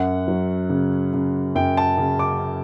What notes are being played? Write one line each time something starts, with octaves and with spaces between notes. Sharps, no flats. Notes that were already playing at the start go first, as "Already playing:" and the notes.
Already playing: F#2 F#5
F#3
C#3
C#3
F#2 G5
A5
C#3
D6